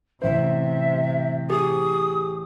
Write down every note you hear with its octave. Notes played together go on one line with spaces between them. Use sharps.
A1 C3 C5 E5
G4 G#4 D#6